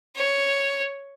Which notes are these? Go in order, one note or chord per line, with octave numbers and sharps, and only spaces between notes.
C#5